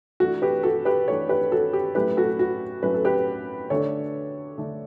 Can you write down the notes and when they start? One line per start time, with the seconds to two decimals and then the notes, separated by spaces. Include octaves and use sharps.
0.20 E3 A3 D4 F#4 A4
0.42 G4 B4
0.63 F#4 A4
0.85 G4 B4
1.08 E3 A3 D4 A4 C#5
1.29 G4 B4
1.51 F#4 A4
1.73 G4
1.95 A2 F#3 A3 C#4 G4 B4
2.17 F#4 A4
2.39 F#4
2.83 A2 F#3 A3 C#4 B4
2.94 A4
3.05 G4 B4
3.70 D3 A3 D4 A4 C#5
4.58 D3 A3 D4